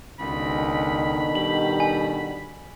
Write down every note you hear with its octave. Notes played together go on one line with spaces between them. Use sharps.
C#2 B2 D3 D#3 B5
G3 F#7
G#5